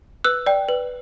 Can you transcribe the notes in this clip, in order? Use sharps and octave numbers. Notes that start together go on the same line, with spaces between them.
B4 E6 F#6
D5 G5
B4